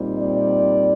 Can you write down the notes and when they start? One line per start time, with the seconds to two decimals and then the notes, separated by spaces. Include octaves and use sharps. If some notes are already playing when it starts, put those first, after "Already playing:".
Already playing: A#2 G3 C4 D#4
0.19 D5